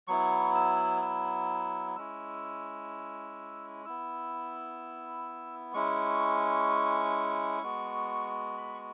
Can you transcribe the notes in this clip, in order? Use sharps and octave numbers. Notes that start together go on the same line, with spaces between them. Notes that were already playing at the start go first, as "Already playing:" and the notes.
F#3 B3 E4 C#6
E6
E6
G#3 C#4 E4 E6
B3 E4 E6
G#3 C#4 E4 C#6
G#3 B3 F#4
B5
C#6